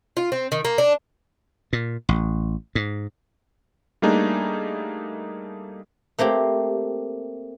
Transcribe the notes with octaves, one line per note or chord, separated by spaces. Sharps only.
F4
C4
D#3
A#3
D4
A#2
A1
G#2
G3 A3 A#3 D4 D#4 G#4
A3 A#3 C4 G4